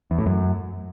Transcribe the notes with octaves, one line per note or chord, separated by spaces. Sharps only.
E2
A2
F#2